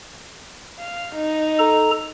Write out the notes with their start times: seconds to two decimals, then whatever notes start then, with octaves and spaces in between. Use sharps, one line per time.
0.80 F5
1.16 D#4
1.59 A4 A#5